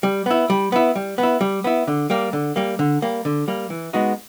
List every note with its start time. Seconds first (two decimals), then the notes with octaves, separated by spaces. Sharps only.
0.03 G3
0.26 B3 E4
0.50 G3
0.72 B3 E4
0.96 G3
1.18 B3
1.23 E4
1.41 G3
1.64 B3 E4
1.87 D3
2.10 G3 A#3
2.33 D3
2.56 G3 A#3
2.79 D3
3.02 G3 A#3
3.25 D3
3.48 G3 A#3
3.70 E3
3.93 G#3 B3 D#4 F#4